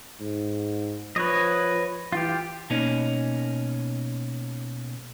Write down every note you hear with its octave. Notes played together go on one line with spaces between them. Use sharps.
G#2
F3 B4 C#5 D#5
E3 F4 G4
B2 A#3 C#4 D#4